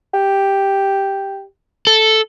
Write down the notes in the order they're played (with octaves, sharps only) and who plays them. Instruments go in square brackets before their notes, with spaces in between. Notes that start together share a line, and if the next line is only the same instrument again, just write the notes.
[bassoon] G4
[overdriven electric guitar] A4